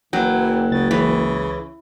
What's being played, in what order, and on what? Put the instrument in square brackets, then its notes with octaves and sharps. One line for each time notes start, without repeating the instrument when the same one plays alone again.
[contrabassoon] F#1 [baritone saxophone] E3 [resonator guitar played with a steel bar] F#3 [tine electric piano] G5
[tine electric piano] C#2 A6 [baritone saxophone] C#3
[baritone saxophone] C#3 [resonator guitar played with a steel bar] E3